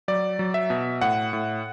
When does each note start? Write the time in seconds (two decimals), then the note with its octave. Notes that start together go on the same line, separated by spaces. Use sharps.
0.08 F#3 D5
0.39 F#3
0.54 E5
0.70 B2
1.01 A2 F#5
1.33 A2